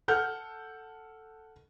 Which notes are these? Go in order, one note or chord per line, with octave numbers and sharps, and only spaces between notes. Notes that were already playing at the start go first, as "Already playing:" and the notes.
A4 F#5 F6 G6